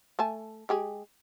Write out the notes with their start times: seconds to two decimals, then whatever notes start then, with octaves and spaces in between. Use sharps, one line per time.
0.19 A3 G#5 A5
0.69 G#3 G4 G#4